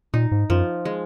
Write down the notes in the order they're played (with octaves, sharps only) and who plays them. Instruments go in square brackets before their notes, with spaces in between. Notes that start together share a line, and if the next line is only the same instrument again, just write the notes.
[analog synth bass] A#2 [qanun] D#4
[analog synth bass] G#2
[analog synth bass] F#2 [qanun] F3
[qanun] G#3